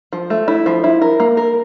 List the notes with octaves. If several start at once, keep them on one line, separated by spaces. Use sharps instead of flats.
F3
A3
E4
F3
E4
A#4
A#3
A#4